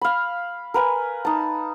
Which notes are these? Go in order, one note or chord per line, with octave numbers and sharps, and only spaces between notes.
F5 B5
A#4 B4 G#5
D#4 A5